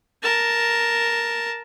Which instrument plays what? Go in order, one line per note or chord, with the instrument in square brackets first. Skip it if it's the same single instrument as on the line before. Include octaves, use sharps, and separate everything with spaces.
[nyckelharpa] A#4 A5